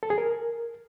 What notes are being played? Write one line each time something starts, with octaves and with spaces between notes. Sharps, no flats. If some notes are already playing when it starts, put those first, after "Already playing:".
A4
G#4
A#4